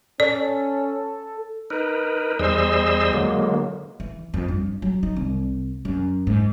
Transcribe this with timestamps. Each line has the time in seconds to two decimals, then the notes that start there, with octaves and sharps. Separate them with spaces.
0.20 C#4 A4 D5
1.70 D#4 A#4 B4
2.39 E2 G3 G#4 C5 D#5 E6
3.13 D3 F#3 G#3 A#3
4.00 E3
4.34 F2
4.48 G2
4.82 F#3
5.03 D#4
5.16 C2
5.85 F#2
6.27 G#2